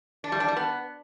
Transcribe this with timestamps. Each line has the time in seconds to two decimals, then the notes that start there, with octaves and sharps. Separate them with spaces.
0.24 D4
0.32 G3
0.40 D4
0.48 G3
0.56 B3